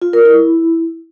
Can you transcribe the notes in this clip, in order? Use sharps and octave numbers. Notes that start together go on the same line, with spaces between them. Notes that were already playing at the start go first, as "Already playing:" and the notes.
F4
A#4
E4